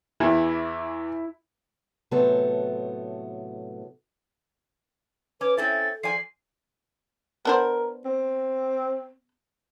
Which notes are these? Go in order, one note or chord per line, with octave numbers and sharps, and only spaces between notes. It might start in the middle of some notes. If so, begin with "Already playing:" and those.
E2 E3 E4
A2 C3 F#3 A3 B3 A4
C#4 B4 D6
C4 C#4 E4 A4 A6
F3 D5 G#5 C7
B3 D4 A#4 C5
C4